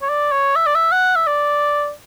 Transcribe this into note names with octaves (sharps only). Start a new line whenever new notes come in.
C#5
D5
C#5
E5
D5
E5
F#5
E5
D5